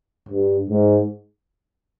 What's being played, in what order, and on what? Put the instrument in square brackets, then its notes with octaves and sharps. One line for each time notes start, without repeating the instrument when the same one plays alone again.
[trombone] G2
G#2